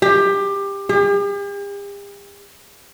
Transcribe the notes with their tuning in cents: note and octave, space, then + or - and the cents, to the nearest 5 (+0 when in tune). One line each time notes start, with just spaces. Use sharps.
G4 +20
G4 +45